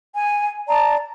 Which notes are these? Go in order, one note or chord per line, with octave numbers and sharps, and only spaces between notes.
G#5
D5 A5 A#5